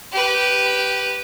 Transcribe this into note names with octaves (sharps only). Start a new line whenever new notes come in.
G4 B4